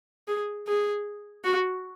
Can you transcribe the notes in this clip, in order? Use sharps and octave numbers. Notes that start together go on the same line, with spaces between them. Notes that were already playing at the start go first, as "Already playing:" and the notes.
G#4
G#4
F#4